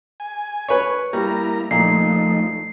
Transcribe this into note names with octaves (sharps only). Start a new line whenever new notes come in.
G#5
B4 C#5
G3 A#3 E4 A#5
A#2 F3 A3 D#4 C7